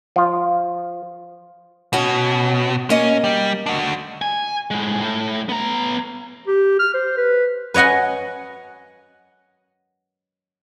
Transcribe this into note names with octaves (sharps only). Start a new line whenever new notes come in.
F3 F4
B2 C#4 F#4
A#3 C#4 D#5
G3
D4 F#4
G#5
A2 G#3
A2 A3
B3 A#5
G4
F6
C5
B4
B4 C#5 D#5 F#5 G#5